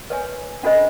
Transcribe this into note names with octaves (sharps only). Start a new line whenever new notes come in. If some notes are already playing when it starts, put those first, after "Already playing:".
B4 C#5 G#5
C#4 D4 F4 A4 C5 D#5